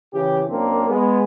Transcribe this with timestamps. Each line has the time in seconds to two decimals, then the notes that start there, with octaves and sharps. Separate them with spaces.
0.14 C#3 E3 G4
0.49 F#2 A#3 C4 D4
0.88 G#3 B3